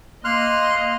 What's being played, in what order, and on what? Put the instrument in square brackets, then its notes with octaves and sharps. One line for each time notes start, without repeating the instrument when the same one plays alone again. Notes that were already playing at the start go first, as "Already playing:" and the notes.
[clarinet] A#3 [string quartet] D#5 [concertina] C6 F6 F#6